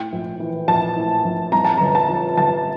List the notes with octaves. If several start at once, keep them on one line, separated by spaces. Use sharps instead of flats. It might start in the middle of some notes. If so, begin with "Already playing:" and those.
Already playing: A2 G5
A#1
E3
A#1 A5
A2
A#1
G2 A#5
A5
G1 A#5
A5
F3
G1 A5